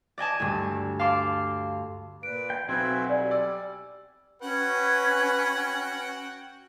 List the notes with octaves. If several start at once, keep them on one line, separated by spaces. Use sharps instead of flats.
D5 D#5 G#5 A5
D2 G2 G#5
F5 A5 C6 D6
A#2 B4 D7
G5
B1 C4 F#4 B4 E5 G#5 C6
G3 D5
D5 E6
C#4 F#4 B4 F#5 G5